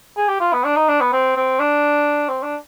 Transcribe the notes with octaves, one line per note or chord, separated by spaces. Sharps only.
G#4
G4
F4
B3
D4
D#4
D4
B3
C4
C4
D4
C4
D4